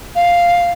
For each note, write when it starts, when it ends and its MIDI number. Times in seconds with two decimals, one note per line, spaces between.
0.15 0.71 77